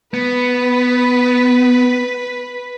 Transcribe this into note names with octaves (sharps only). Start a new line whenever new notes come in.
B3 B4